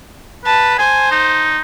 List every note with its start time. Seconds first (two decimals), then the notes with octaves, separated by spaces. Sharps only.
0.45 B4 A5
0.79 C5 G#5
1.11 D#4